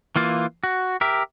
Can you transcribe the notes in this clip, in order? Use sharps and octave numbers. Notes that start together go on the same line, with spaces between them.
E3 A#3 F4
F#4
G4 A#4 E5